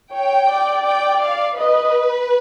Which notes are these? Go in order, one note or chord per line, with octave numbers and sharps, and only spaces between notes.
C#5 G5
D5
G5
F5
B4 D#5